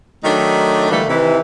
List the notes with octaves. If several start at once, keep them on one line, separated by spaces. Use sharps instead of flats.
D#3 F#3 A3 D4 D#4
D3 E3 G3 A3 A#3
C3 D#3 E3